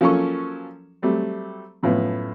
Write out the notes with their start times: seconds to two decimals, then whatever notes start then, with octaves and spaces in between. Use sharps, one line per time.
0.01 F3 F#3 A#3 C#4 A4 C#6
1.02 F#3 G3 A3 C4
1.83 F#2 A2 F3 B3